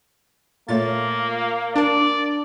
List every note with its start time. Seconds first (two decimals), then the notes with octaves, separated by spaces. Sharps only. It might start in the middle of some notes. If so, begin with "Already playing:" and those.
0.68 A#2 A3 A#3 C#5 A6
1.76 D4 A#4 D5 A5